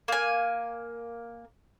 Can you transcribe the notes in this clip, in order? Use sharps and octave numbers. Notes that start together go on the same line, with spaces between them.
A#3 G#5